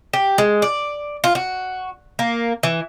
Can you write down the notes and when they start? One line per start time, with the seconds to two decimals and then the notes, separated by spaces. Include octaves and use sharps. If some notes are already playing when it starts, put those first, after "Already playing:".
0.13 G4
0.38 G#3
0.62 D5
1.24 F4
1.35 F#4
2.19 A#3
2.63 E3